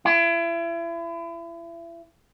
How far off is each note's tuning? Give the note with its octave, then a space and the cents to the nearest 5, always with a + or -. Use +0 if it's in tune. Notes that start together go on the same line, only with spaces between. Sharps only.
E4 +35